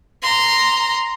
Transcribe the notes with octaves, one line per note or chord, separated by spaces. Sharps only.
A#5 C6